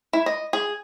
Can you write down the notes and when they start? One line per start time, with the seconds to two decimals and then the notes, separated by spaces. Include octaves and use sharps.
0.13 E4
0.26 D#5
0.53 G#4